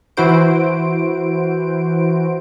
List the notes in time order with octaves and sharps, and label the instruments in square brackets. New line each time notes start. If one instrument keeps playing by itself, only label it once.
[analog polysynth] E3 E4 F#4 C5 D7